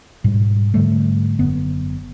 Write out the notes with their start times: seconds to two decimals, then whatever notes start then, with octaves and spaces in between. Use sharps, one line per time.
0.24 G#2 B2 G3
0.74 G#2 D3 G3 A3
1.39 F#1 D3 B3